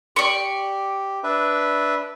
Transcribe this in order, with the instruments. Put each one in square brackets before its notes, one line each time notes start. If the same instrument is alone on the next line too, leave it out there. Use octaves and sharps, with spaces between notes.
[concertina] G4 [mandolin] D5 C#6
[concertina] D4 B4 E5